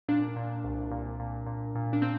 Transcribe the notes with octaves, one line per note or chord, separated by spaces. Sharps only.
A#2 D4
A#2
C2
A#2
A#2
A#2
A#2
D4
A#2 C4